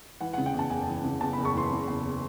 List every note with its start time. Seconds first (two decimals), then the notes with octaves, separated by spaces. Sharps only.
0.21 E3 F#5
0.34 F#5
0.38 C#3
0.46 G5
0.54 E2 A5
0.70 F#1 G#5
0.88 E3
1.04 C#3
1.21 E2 A5
1.33 B5
1.38 F#1
1.45 C#6
1.54 E3 C6
1.71 C#3
1.88 E2